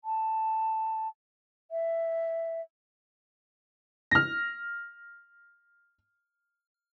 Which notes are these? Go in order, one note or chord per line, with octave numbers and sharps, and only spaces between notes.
A5
E5
F6 A#6